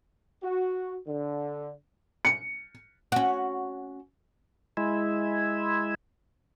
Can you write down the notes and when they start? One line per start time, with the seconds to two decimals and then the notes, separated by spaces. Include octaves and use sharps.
0.43 F#4
1.07 D3
2.25 C#7
3.12 C#4 F#4
4.77 G#3 E4